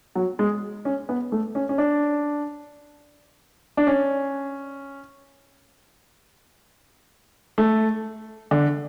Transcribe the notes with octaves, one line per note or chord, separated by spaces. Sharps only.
F#3
G#3
C#4
B3
A3
C#4
C#4
D4
D4
C#4
A3
D3